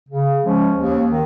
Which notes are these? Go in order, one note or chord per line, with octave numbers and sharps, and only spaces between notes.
C#3
F3 G#3 C#4
D#2
D#3